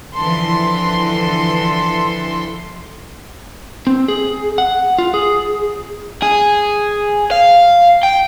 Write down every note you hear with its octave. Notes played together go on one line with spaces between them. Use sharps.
D3 E3 F3 A4 C6
C4
G#4
F#5
F4
G#4
G#4
F5
G5